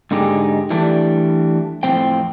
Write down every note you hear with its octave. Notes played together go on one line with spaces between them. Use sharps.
G#2 D3 D#4 G4 G#4
E3 G3 A3 D4
F2 A2 E3 C4 G5